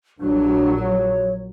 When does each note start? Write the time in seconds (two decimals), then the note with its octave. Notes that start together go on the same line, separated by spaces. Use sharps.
0.20 A#1 F#3 D4
0.80 C#5